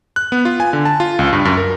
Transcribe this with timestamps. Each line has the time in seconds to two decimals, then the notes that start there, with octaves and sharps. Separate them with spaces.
0.16 F#6
0.32 B3
0.45 F4
0.60 G#5
0.73 D3
0.85 A5
1.00 F4
1.19 C#2
1.33 G2
1.45 F#2
1.57 A#4